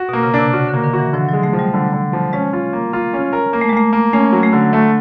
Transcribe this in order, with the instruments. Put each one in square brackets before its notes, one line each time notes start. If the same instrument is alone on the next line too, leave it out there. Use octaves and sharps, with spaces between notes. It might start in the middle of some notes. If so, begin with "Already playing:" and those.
Already playing: [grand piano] F#4
[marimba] B2
[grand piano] A#3
[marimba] C#3
[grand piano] D4
[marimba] C3
[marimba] C#3 [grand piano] F#4
[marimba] D3
[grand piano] A#3
[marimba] D#3
[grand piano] F#4
[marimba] E3
[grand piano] D3 [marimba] F3
[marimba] F#3
[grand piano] G#3
[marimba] A3
[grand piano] F3
[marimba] G3
[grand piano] D3
D3
F3
[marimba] G#3 [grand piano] C#4
[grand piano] F4
A#3
F4
C#4
A#4
A#3
[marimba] A3
G#3
[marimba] A3 [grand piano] A#3
[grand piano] A#3
[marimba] A3 [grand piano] C#4
[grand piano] F#3
[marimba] A3
[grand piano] D3
A3